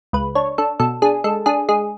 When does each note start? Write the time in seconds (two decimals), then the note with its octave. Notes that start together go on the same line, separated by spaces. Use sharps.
0.13 C#2 B4
0.35 D4 C#5
0.58 D4 A4
0.80 B2 A4
1.02 D4 G#4
1.24 G#3 A4
1.46 D4 G#4
1.69 G#3 G#4